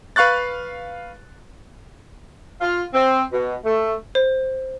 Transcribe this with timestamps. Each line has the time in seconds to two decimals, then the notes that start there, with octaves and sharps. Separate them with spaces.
0.16 B4 F5 C#6 F#6 A6
2.61 F4
2.93 C4
3.32 B2
3.65 A3
4.15 C5